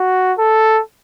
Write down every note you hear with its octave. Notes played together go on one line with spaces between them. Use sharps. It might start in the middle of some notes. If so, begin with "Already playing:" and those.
Already playing: F#4
A4